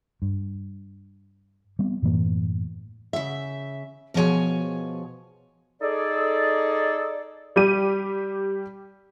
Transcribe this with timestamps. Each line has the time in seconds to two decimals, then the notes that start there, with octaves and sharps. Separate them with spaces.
0.22 G2
1.79 G3 B3 C4
2.02 F#2 A2 E3 A#3
3.13 C#3 E5
4.14 B2 F3 G#4 C5 C#5 G#5
5.82 D#4 G#4 A4 D5
7.56 G3 G4 D#7